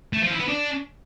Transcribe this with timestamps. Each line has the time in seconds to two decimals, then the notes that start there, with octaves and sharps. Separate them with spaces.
0.13 A3
0.22 F3
0.31 E4
0.40 B3
0.49 D4